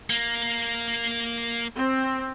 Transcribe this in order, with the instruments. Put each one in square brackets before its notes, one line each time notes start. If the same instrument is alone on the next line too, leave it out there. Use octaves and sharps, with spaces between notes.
[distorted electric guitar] A#3
[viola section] C4